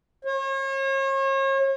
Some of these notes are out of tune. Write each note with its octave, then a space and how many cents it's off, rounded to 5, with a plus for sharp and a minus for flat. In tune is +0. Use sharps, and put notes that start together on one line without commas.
C#5 -40